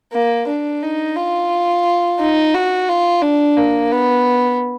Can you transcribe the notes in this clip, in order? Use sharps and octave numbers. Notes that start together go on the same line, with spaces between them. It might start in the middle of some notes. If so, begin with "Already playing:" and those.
A#3
D4
D#4
F4
D#4
F#4
F4
D4
A#3
B3